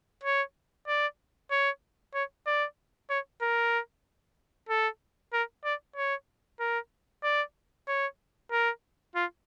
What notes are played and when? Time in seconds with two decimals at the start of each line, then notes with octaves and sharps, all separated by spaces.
0.23 C#5
0.88 D5
1.51 C#5
2.14 C#5
2.47 D5
3.10 C#5
3.42 A#4
4.69 A4
5.33 A#4
5.65 D5
5.96 C#5
6.60 A#4
7.23 D5
7.88 C#5
8.52 A#4
9.15 F4